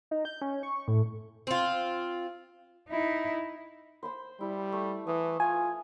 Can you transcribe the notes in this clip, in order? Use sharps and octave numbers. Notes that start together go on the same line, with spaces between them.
D#4
G6
C#4
C#6
A2
C4 F4
D#4 E4
C5 B5 C6
G3 E4
A3
E3 D#6
F4 G#5